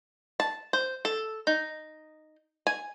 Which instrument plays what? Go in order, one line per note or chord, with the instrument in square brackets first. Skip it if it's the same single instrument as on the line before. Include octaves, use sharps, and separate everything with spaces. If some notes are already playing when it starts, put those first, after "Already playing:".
[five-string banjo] A5
C5
A4
D#4
G#5